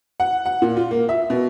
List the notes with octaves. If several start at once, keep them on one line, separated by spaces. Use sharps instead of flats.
F#5
F#5
A#2
F4
A#3
E5
B2